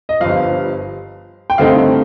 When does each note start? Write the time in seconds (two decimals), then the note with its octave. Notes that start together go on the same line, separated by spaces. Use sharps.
0.09 D#5
0.20 G1 G2 F3 F5
1.50 G5
1.58 G2 D3 A3 C4 D#4 F5